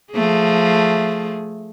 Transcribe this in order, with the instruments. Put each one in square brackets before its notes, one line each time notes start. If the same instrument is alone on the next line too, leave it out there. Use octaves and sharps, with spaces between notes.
[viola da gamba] F3 A3 G#4